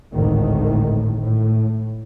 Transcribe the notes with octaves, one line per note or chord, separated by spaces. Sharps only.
G#1 D2 A2 D#3
A2